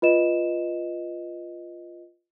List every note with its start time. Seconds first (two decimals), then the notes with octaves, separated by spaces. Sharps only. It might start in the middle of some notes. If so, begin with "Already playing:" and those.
0.02 F4 B4 D#5 E7